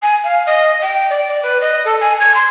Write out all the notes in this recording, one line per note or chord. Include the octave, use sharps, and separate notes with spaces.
G#5
F5
D#5
G5
D5
D5
B4
D#5
A4
G#5
G#6
C6